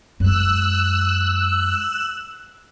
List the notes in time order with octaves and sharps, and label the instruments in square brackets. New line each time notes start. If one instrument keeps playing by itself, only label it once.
[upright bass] F#2 G#3 [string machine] E6 F#6